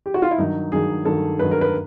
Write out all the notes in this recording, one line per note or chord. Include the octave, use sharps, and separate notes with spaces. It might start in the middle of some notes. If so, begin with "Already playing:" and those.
G4
F#4
F4
E4
G2 D#3 F#3 D#4
G2 D#3 F#3 G#4
G2 D#3 F#3 A4
G2 D#3 F#3 B4
A#4
B4